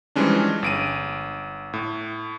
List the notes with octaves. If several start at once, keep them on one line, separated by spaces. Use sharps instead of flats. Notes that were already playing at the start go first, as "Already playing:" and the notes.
E3 F3 G3 G#3 C#4 D4
G1 D7 D#7
A2